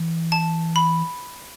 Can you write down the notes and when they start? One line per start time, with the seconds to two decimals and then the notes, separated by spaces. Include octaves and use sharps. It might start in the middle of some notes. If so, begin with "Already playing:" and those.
Already playing: E3
0.32 A5
0.76 B5